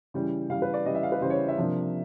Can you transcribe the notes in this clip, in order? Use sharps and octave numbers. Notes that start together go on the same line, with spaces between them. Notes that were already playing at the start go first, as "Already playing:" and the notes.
C#3 E3 G3
C#3 E3 G3 F5
B4
D5
C#3 E3 G3 D#5
E5
F5
B4
C#3 E3 G3 C5
C#5
E5
C3 F3 A#3 D4